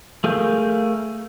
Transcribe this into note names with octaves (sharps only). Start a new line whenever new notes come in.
A3 G#4 A#4 F5 G6